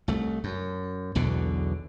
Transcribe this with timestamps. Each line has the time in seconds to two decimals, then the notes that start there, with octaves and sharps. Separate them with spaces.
0.08 C2 A3
0.44 F#2
1.15 B1 E2 B2 D3